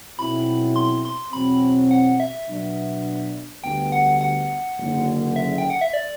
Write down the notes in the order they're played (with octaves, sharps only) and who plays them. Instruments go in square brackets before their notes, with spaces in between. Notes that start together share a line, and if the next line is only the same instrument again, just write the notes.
[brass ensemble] B1 B2 F#3 C4 E4 [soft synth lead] B5
[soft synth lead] C6
C6
[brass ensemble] E2 B2 F#3 C4 [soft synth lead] B5
[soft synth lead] F#5
E5
[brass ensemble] B2 F#3 B3 D4
[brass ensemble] D2 D3 G3 B3 [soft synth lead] G5
[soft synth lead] F#5
F#5
[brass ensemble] F#1 F#2 D3
[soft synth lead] E5
G5
F#5
E5
D5